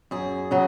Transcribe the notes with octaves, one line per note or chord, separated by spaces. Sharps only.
F#2 G#4
C#3 F#3